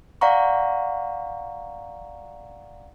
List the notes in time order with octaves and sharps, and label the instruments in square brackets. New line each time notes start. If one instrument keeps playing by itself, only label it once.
[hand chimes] D5 F5 F#5 A#5 C#6